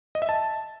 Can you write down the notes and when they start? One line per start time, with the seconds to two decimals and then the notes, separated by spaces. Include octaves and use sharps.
0.15 D#5
0.22 E5
0.29 A5